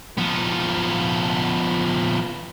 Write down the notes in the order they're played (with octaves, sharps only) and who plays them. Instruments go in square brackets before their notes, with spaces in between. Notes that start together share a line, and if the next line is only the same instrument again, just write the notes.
[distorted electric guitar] F3 B3